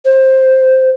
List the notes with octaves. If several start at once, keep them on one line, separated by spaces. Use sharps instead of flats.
C5